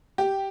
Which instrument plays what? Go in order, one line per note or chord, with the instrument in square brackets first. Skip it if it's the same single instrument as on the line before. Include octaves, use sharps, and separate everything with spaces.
[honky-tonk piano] G4